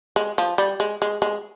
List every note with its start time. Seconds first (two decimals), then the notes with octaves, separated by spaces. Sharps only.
0.16 G#3
0.38 F3
0.58 G3
0.80 G#3
1.02 G#3
1.22 G#3